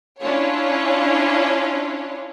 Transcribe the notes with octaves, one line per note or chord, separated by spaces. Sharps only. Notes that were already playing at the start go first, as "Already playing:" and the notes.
C#4 D4 E4 F4 C#5